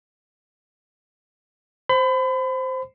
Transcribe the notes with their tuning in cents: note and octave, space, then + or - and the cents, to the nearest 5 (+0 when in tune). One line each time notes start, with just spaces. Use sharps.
C5 +0 B5 +35